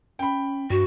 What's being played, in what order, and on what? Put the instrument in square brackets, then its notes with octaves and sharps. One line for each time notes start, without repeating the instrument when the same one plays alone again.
[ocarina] C#4 [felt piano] G5 B5
[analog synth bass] G2 [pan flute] F#4